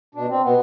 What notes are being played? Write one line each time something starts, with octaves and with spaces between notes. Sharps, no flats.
B2 D4
C4
B2 B3